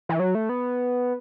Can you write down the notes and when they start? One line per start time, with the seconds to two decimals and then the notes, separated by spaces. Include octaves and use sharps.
0.09 E3
0.20 F#3
0.35 A3
0.49 B3